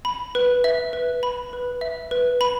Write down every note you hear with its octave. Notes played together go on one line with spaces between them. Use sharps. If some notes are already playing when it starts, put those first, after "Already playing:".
B5
B4
E5
B4
B5
B4
E5
B4
B5